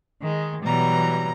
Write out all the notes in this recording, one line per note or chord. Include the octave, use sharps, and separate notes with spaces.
D#3 G#3
B2 E3 F#3 G3 A#5